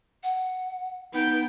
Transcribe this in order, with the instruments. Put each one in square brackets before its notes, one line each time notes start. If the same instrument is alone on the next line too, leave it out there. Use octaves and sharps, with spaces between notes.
[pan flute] F#5
[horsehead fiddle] B3 G5 [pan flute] D#4